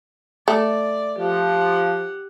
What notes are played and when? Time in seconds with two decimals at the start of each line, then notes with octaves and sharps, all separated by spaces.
0.48 A3 D5
1.18 F3 G4 F#5